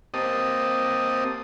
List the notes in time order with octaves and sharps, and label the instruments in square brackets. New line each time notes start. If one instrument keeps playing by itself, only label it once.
[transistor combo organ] A#3 C4 G4 D#5 A5 D#6